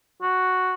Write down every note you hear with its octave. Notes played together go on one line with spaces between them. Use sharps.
F#4